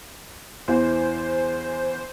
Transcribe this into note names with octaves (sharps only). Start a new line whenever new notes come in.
E2 E3 C5